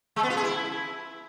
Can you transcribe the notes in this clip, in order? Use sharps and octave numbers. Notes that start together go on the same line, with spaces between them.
G#3
B3
F4
G#4
E4